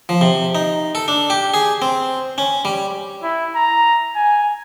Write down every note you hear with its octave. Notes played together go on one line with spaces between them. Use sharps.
F3
C3
D#4
A4
D4
G4
G#4
C4
C#4
G3
E4
A#5
G#5